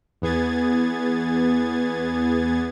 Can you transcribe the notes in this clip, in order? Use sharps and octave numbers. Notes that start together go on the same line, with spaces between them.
E2 B3 G#4 G#6 A6